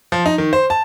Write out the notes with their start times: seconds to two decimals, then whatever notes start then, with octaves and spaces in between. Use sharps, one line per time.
0.12 F3
0.26 D#4
0.38 D#3
0.53 C5
0.70 A5